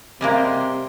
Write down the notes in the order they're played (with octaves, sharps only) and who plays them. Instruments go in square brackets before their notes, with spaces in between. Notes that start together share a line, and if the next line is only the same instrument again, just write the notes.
[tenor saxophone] C3 [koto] G3 G#3 A#3